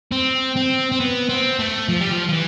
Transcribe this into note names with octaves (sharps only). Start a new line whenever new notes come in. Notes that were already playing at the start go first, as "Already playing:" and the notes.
C4
C4
C4
B3
C4
A3
F3
G3
F3
F3
E3